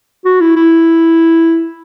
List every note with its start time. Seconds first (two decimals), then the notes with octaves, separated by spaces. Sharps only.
0.25 F#4
0.41 E4
0.56 E4